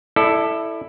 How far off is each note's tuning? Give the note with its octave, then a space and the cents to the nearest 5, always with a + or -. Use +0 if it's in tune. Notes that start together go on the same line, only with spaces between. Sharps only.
E4 +0 A4 +0 D5 +30